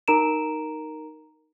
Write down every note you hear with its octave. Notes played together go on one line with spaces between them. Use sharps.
D#4 A#4 A#5 D7 E7